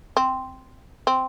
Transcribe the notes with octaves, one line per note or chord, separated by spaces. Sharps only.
C4
C4